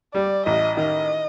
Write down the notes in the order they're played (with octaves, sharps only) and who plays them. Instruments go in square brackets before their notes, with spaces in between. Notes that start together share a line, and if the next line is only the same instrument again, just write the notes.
[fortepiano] G3 [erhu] D5
[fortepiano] A1 [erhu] D#5
[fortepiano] D#3 [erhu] D#5